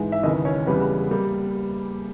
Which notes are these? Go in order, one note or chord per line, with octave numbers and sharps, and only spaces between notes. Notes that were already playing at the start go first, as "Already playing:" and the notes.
Already playing: G#2 E3 G#3
E5
D#2 C#3 E3 D#4 D#5
C#4 C#5
E2 C#3 G3 B3 B4
G3 A#3